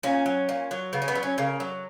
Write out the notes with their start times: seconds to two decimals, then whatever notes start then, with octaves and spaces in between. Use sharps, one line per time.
0.03 A#2 C#4
0.26 F#3
0.49 A#2
0.71 F#3
0.93 C#3 B3
1.02 C#4
1.08 B3
1.15 F#3
1.23 C#4
1.38 C#3 A#3
1.60 F#3